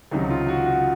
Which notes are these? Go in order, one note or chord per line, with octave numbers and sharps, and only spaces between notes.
C#2 C3 D#3 F#3 D#4
F4
F#4
F#4